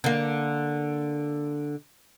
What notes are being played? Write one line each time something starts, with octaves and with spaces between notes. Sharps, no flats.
D3 A#3